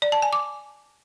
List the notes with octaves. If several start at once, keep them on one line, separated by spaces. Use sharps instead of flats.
D5
A5
G#5
D6